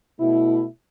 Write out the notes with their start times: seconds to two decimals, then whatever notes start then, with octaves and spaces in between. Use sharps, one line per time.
0.18 B2 A3 E4